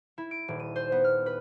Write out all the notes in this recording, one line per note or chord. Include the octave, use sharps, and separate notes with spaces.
E4
D7
D#1
D#7
C5
B3
F6
B4